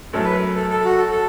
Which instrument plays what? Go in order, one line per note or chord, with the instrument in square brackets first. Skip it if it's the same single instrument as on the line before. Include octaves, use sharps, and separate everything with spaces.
[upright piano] F#2 F#3 A3 [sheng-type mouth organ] A4
[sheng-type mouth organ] B4
A4
A4
F#4
A4
A4